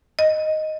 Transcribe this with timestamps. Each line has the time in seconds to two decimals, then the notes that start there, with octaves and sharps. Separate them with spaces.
0.19 D#5